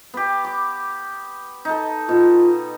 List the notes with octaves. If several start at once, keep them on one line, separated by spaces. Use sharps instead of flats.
B3 G4
D6
D#4 A4
B2 F4